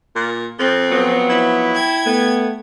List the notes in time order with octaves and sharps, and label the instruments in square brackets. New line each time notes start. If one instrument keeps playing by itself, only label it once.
[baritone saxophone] A#2
[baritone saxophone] F2 [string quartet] C4
[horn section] F3 F#3 B3
[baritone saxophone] E4
[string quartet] G5 G#6
[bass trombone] A3 [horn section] B3